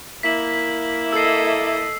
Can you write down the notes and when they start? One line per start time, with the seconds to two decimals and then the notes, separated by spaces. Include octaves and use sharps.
0.23 A#3 E4 B6 F#7
1.12 A4 D#5 E6 C7